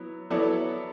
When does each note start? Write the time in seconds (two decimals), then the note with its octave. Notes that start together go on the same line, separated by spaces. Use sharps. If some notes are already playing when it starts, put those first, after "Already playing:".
Already playing: F#3 B3 E4
0.30 F#3 B3 E4 A4 D5